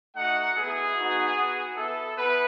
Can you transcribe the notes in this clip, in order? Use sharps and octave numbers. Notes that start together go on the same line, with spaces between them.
A3 D#4 F#4 F#5
B3 E4 G#4
B3 D#4 F#4
B3 F#4
B3 E4 A4
B3 E4 B4